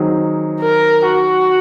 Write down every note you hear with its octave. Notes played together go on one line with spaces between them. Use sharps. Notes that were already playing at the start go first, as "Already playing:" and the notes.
Already playing: D#3 F#3 C4 D#4 G#4
A#4
F#4